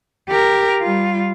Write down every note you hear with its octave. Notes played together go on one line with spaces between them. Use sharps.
G4 A#4
G3 F4